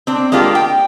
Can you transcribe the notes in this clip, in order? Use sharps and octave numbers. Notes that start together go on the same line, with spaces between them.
C4 D4
G#3 A#3 D4 F4 G4
G5